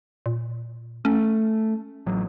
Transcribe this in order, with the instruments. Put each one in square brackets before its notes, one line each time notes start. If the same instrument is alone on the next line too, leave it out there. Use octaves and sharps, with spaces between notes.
[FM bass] A#2
[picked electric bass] A3 [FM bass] C#4
[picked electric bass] A1 F#3